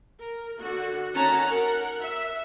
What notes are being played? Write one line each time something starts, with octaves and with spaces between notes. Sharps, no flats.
A#4
D3 F#4
D#3 C#4 F#4 F#5 A5 A#5
A#4 F#5
E5